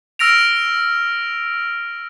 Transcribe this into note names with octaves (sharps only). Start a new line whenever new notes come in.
E6 F6 A#6 D7 F7